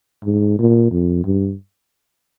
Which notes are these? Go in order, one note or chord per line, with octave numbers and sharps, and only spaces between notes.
G#2
A#2
F2
G2